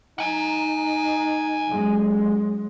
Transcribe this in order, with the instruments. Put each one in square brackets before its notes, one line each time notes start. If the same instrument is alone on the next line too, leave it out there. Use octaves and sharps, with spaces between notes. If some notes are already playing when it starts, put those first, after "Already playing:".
[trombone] D#4 [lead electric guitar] F#5 G#5
[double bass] F#2 G#3